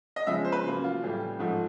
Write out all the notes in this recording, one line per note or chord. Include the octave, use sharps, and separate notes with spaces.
D#5
C#3 F3 G#3 B3 E5
C5
B4
C#3 F#3 A#3
F4
A2 E3 G3
G#2 F3 A3